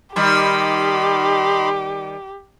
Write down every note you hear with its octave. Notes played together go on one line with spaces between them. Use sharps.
D#3 G3 D#4 G4 B5 C6